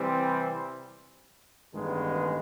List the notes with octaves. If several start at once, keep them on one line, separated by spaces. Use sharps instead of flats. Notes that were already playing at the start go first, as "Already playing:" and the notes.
Already playing: C3 E3 G3 C4
A1 G2 D#3 G#3 B3